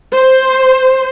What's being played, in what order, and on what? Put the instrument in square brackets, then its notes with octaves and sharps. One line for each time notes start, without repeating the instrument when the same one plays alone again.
[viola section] C5